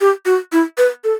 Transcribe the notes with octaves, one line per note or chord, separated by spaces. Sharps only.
G4
F#4
E4
B4
A4